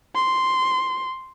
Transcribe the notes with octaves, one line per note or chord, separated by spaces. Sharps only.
C6